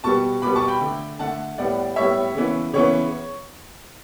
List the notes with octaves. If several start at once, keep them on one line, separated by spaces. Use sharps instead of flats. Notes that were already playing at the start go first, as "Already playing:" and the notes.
B2 G3 B3 A5 C#6
B2 G3 B3 B5 D6
A5 C#6
G5 B5
D3 A3
D3 A3 F#5 A5
A2 G3 B3 D5 F#5
A2 G3 B3 C#5 E5
C#3 E3 B3
C#3 E3 B3 C#5